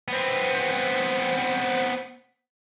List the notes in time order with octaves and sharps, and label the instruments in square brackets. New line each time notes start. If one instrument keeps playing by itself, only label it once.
[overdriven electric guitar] B3 C4